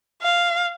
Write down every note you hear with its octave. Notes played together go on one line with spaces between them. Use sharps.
F5